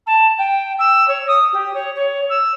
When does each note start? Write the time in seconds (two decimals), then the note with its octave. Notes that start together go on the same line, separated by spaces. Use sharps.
0.06 A5
0.38 G5
0.78 E6
1.08 C#5
1.27 D#6
1.52 G4
1.74 C#5
1.95 C#5
2.29 E6